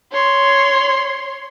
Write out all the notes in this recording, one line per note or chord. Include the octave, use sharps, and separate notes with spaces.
C#5 C6